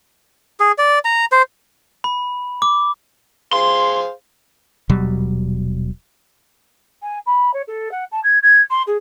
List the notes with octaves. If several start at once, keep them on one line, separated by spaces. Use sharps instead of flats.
G#4
D5
A#5
C5
B5
D6
G#4 C5 F5 C6
D#1 B2 F#3 G3
G#5
B5
C#5
A4
F#5
A5
G#6
G#6
C6
G#4